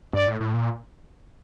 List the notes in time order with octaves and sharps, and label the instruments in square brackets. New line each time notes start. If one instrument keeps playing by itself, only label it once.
[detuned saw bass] G2 [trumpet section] D5
[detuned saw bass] A2
A2
A#2